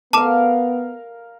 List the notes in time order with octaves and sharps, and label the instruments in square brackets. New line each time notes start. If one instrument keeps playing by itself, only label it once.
[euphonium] B3 [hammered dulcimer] A#4 F5 [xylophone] A5 D6 E7